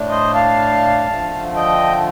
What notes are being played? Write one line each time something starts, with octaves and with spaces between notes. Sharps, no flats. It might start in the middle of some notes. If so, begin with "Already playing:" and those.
Already playing: A2 A3 D4
C5 D#5
F5 A5
D3 F3 A3
D#5 G5